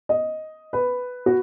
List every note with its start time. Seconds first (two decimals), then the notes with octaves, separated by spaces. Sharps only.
0.09 D#5
0.73 B4
1.26 F#4